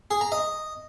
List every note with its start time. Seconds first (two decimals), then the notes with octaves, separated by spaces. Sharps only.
0.11 G#4
0.21 A#5
0.32 D#5